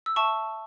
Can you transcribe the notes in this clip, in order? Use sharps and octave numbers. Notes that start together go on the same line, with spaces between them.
E6
E5 A5 C#6